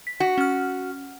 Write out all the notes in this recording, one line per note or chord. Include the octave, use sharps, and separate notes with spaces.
B6
F#4
C#4 F6